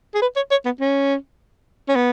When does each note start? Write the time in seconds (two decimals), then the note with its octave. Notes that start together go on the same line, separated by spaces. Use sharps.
0.14 G#4
0.22 B4
0.36 C#5
0.51 C#5
0.65 B3
0.80 C#4
1.88 C#4
1.95 B3